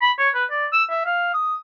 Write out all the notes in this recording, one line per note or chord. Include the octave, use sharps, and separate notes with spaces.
B5
C#5
B4
D5
E6
E5
F5
D#6